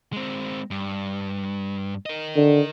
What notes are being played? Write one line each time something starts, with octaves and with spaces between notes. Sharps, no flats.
G#3 C4
G2
A#4 D#5
D3